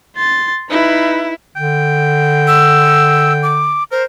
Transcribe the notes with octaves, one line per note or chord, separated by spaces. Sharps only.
C6 A6
D#4 E4 B4
D3 G5
E6
D6
A#4 C5